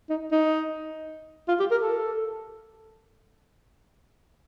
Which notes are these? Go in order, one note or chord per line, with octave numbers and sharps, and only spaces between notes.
D#4
D#4
F4
G4
A#4
A4